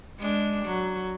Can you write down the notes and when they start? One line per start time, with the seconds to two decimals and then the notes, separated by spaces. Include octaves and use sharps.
0.19 G#3 D4
0.66 F#3